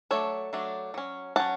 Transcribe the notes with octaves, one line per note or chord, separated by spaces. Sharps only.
F#3 A3 D4 A4 C#5
F#3 A3 D4
F#3 C#4
F#3 C#4 F#5 A5